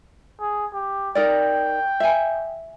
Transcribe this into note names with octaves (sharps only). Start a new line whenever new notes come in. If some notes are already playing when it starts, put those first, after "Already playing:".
G#4
G4
D#4 A#4 D5 G5
E5 G#5